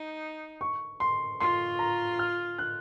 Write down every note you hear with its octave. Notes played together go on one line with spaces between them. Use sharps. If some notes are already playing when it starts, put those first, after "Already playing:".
Already playing: D#4
C#6
C6
F4 C6
A#5
F6
F#6